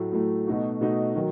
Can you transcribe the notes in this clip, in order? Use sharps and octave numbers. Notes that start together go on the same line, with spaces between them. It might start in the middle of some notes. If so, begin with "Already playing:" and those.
Already playing: A2 F#3 A3
A2 F#3 A3
B2 A3 D#4 F#4
B2 A3 D#4 F#4
D#3 F#3